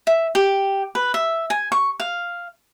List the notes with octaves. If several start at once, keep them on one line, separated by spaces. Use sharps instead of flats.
E5
G4
B4
E5
G#5
C#6
F5